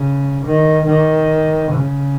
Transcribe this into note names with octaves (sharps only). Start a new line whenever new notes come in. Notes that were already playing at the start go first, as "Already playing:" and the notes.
Already playing: C#3
D#3
D#3
C#3